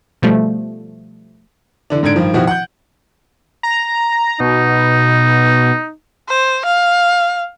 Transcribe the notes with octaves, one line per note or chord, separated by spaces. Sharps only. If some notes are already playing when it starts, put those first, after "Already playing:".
B2 F3 G3 A3
D3 E3 D4
G#2 D3 D4 G#6 D7
G2 D#3 F3
B2 D#3 F3 E4 F#4 G4
F#5 G6
A#5
B2 D#4
C5
F5